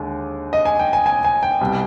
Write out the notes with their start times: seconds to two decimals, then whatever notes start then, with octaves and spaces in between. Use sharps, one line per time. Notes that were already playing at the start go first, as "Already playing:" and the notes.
Already playing: D#2 D3 G#3
0.53 D#5
0.65 G#5
0.79 G5
0.93 G#5
1.06 G#5
1.24 G#5
1.43 G5
1.61 C2 B2 G3